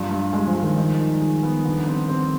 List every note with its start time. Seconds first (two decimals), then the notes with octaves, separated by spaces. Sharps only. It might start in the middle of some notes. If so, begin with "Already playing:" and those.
Already playing: G2 F3 G3
0.11 G2
0.33 G3 G#3
0.48 F3
0.55 G#3
0.63 D#3
0.77 D#4
1.00 D#3
1.20 G#4
1.43 B3
1.65 D3
1.87 C4
2.08 C4